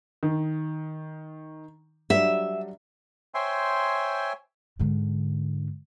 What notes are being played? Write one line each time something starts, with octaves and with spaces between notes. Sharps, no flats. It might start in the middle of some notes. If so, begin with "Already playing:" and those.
D#3
F#3 G3 D4 E5
C5 C#5 E5 G5 G#5 C6
G#2 D3